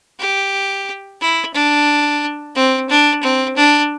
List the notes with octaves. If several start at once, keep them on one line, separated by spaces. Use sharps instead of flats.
G4
E4
D4
C4
D4
C4
D4